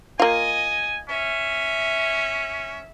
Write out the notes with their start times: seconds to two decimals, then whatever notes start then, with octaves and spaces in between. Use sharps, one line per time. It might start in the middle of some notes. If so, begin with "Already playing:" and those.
0.20 A#3 F4 D#5 G#5
1.09 C#4 E5